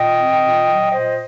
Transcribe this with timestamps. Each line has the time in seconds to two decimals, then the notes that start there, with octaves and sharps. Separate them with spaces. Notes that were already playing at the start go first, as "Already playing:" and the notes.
Already playing: A#2 D#5 G5
0.16 C4
0.41 A#2
0.65 F#3
0.90 A#2 C5 D#5